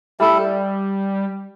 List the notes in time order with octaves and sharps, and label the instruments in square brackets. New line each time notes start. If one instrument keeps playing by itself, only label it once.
[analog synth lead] G3 [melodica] A3 E4 A4